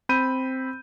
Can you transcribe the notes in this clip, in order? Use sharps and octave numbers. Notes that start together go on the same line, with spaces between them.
C4 B5 G6 D#7